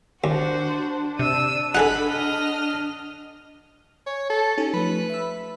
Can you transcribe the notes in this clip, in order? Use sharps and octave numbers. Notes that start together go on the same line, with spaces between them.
D#2 D4 F#4 C5
C3 E6 D#7
D#4 G#4 A4 F#5 B5
D#5 F6
C#5 G#5
A4
C#4 D#4 G4 A4
F3 A3 B4
E5 E6